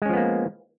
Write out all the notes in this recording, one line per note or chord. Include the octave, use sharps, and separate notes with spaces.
F3 G#3 A#3 B3 C#4